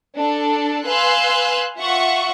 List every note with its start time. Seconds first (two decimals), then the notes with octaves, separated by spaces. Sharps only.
0.16 D4 A4
0.86 B4 F5 G#5 C6 E6 F#6
1.78 F4 E5 F#5 C#6